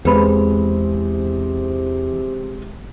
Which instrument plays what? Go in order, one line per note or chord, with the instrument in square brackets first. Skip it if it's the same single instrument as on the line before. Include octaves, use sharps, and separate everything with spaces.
[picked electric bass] E2 [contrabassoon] C3 [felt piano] G#3 C4 [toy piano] G#4 B4 B5